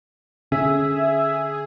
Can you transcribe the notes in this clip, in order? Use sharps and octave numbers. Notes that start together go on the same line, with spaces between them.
D3 C#4 G#4 E5